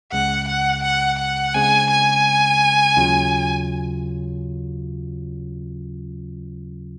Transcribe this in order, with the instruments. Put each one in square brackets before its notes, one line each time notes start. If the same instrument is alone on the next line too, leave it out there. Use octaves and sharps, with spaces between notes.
[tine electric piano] C#2 C#3 G#3 [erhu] F#5
[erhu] F#5
F#5
F#5
[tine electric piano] C#3 G#3 C4 [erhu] G#5
[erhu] G#5
[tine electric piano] D#2 C#3 F#3 C#4 F4